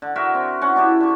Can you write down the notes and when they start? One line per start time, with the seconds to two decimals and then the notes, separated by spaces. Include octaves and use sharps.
0.02 D3
0.15 F#4 A#4 E5
0.34 C4
0.61 C#4 F#4 F#5
0.76 D4 E4 G4
1.00 D3 C#6